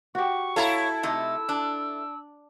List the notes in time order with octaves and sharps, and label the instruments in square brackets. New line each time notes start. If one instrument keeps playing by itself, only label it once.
[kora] F#4 G4 [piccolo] C#6
[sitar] E4 A4 [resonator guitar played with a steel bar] C#5 F5 A#5
[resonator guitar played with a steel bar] C3 A3 D#4 [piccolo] E6
[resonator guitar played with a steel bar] D4